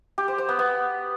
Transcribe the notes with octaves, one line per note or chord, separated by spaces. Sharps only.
G4
C5
C5
B3
B3